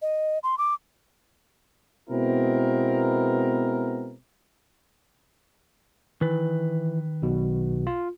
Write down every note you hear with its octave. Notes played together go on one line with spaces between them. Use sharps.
D#5
C6
D6
B2 G#3 B3 C4 E4 A#4
D#3 E3 B4
B1 B2
F4